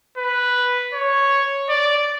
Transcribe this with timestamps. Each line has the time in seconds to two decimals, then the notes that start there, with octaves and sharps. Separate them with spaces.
0.17 B4
0.93 C#5
1.69 D5